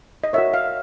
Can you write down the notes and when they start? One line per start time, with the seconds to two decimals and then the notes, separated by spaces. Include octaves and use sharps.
0.24 D#5
0.33 F#4 A#4 C#5 E5
0.54 F5